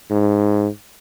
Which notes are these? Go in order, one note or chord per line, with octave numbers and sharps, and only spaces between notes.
G#2